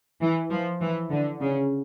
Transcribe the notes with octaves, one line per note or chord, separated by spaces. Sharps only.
E3
F3
E3
D3
C#3